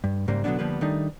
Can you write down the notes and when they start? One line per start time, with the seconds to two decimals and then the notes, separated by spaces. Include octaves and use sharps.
0.04 G2
0.28 G#2 C#3 G3 A#3
0.44 B2 D3 F#3 G3 B3 D4
0.59 D3 F3 G3 A#3 B3 B4
0.81 D#3 G3 A3 D4 D#4